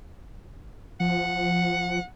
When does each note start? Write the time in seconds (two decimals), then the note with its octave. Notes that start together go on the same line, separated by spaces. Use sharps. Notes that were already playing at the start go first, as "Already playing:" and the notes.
1.00 F3 F#5